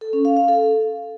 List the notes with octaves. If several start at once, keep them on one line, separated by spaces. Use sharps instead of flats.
A4
C#4
F5
F5
A4